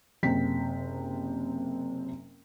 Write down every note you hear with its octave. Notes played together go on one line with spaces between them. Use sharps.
F#1 C3 G5 B6